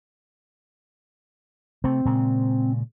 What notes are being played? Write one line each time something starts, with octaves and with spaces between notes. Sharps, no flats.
C3 A3 C4
A#2 C#3 G#3